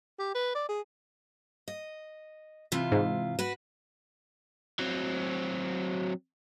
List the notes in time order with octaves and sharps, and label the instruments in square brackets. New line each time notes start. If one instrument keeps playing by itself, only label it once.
[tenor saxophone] G4
B4
D5
G#4
[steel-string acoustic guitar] D#5
C3 E3 F4
[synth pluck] G#2
[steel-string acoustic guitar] F#4 B4
[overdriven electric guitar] F#3 C4